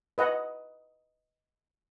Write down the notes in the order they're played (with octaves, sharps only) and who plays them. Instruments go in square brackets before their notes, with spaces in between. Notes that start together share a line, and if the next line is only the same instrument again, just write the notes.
[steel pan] B4 D#5 F#5